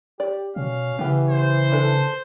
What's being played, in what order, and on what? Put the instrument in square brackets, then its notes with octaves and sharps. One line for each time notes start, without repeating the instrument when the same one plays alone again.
[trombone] G4 [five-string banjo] D5
[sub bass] B2 [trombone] C#4 [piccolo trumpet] F5
[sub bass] C#3 [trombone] E3 [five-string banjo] B3 G4
[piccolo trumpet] C5
[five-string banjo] D4 A4 B4